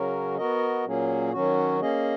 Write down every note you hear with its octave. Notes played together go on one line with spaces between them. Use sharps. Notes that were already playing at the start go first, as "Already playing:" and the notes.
Already playing: C#3 F#3 C#4 F#4 A#4
B3 F#4 A#4 D#5
A#2 F#3 A#3 C#4 G#4
D#3 F#3 C#4 F#4
A#3 C#4 G#4 D#5